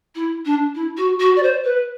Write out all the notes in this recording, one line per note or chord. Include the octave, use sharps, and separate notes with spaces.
E4
D4
E4
F#4
F#4
D5
C5
B4